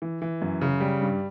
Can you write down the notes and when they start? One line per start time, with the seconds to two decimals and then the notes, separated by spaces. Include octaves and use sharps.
0.02 E3
0.22 E3
0.42 F#2
0.61 C#3
0.81 G3
1.01 G2